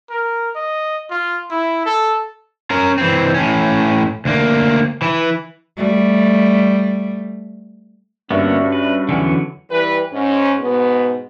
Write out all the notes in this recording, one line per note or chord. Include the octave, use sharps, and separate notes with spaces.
A#4
D#5
F4
E4
A4
C#4 A#4
E3 C4
A2 C#4
D2 A#3
E3 E4
G3 A3
G2 D3 A#3 B3 C#4 F#4 E5
B4
E2 D3 E3 F#3 C#4 F#5
E3 G3 B4
G#2 C#4
G#2 B2 B3